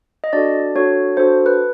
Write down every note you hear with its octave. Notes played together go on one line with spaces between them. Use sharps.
D#5
D4 F#4 A4 D5
D4 F#4 A4 C#5
D4 F#4 A4 C5
B4